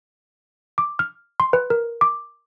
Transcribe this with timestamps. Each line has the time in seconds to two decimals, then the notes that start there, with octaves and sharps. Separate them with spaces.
0.78 D6
0.99 F6
1.40 C6
1.53 B4
1.70 A#4
2.01 D6